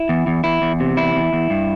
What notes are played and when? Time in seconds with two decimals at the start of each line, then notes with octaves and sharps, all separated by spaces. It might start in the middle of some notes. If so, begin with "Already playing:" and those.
Already playing: E4
0.09 E2
0.27 E2
0.44 E2 E4
0.62 E2
0.80 C3
0.97 E2 E4
1.15 E2
1.33 E2
1.50 G2